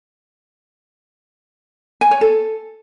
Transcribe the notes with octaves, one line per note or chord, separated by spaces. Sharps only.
G#5
C#5
A4